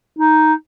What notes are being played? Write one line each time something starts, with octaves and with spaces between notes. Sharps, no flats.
D#4